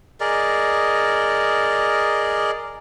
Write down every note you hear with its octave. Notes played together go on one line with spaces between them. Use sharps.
G#4 A#4 D5 D#5